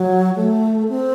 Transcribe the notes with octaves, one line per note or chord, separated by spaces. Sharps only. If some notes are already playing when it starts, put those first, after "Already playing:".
Already playing: F#3
A3
C4